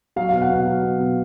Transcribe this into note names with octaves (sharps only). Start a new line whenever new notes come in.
F#3 F5
F5
B2
F#5
B2 F5
F#3
F#3
B2